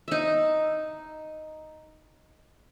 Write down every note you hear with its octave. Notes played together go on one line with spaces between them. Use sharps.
D#4 E5